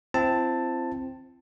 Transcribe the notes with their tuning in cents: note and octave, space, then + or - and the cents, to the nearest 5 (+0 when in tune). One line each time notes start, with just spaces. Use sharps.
C4 +0 E4 +45 A5 +10